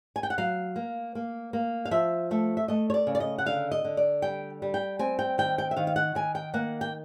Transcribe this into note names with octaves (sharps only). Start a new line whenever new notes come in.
G#5
G5
F#5
F#3 F5
A#3
A#3
A#3
F5
F3 E5
A3 E5
E5
A3 D#5
C#5
D5
C#3
D5
D#5
F#5
D3 F5
D#5
D3
D5
G3 G5
G3
G5
C4 G#5
G5
D#3 G5
G5
E5
D#3 F5
F5
F#5
D#3 G#5
G5
A#3 F#5
G5